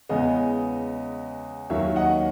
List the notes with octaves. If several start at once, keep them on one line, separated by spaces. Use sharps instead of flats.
E2 C#3 G#3 B3 D#5
D#2 D#3 F#3 A#3 C#4 C#5 E5
D#5 F#5